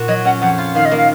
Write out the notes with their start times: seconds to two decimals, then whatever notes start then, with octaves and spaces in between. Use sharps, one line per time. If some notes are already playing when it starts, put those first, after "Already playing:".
Already playing: A#2 F#4
0.08 F#3 D#5
0.25 C#4 F#5
0.41 F2 F#5
0.58 F4
0.75 D#3 F5
0.86 D#5
0.91 A#3
0.97 F5